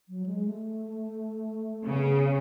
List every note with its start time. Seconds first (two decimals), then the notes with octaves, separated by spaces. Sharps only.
0.09 F#3
0.26 G#3
0.45 A3
1.86 C#3 B3